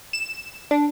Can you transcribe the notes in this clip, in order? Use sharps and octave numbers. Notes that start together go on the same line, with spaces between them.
E7
D4